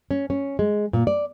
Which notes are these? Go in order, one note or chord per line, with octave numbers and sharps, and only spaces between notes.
C#4
C#4
G#3
A#2
D5